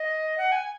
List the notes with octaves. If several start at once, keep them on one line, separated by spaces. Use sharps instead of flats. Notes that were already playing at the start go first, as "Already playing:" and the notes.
Already playing: D#5
F#5
G#5